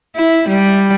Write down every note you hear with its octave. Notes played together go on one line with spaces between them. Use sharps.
E4
G3